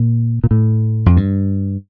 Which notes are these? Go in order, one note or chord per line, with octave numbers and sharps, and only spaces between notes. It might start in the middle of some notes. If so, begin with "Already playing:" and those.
Already playing: A#2
A#2
A2
F2
G2